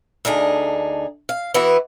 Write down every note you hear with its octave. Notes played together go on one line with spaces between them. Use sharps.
D2 D4 D#4 G#4
F5
E3 B3 E4 F#4 B4